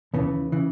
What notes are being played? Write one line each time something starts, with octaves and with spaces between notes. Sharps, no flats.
D#2 C#3 E3 B3
C#3 E3